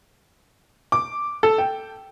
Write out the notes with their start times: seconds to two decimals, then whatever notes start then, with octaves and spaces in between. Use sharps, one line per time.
0.92 D6
1.43 A4
1.58 G5